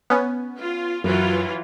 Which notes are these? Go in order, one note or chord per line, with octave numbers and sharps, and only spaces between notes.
B3 C#4
F4
F#2 E3 F#3 F4